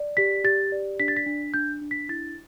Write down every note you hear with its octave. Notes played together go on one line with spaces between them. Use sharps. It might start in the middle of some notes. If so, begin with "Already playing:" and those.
Already playing: D5
G4 B6
G4 A6
D5
D4 B6
A6
B6
D4
D4 G6
D4
B6
E4 A6